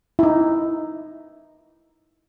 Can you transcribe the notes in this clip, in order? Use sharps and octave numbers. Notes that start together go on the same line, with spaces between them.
D#4 E4